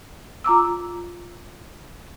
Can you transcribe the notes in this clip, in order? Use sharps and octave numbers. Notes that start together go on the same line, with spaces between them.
F4 A#5 D6 E6